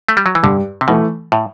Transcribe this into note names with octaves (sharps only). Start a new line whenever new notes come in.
A3
G3
F#3
E3
G2 D3
C3
B2 E3 A3
A2